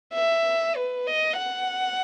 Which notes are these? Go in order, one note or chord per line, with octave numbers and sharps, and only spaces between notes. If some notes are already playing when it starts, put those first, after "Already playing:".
E5
B4
D#5
F#5